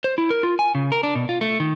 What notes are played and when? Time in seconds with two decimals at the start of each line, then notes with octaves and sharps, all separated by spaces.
0.04 C5
0.18 E4
0.30 A#4
0.43 F4
0.59 G#5
0.75 C#3
0.92 A#4
1.03 D4
1.15 B2
1.29 F4
1.41 A3
1.60 D#3